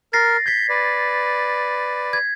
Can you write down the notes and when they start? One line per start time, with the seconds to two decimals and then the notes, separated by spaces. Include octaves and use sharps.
0.13 A#4 A6 A#6 C7
0.46 G6 G#6 B6
0.69 B4 D5
2.13 G#6